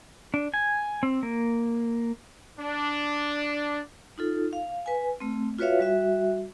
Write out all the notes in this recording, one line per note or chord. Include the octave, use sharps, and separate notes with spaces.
D4
G#5
C4
A#3
D4
D#4 F4 A4
F5
B4 G#5
A3 C4
F4 F#4 B4 C#5 E5 F5
G3 F#4 E5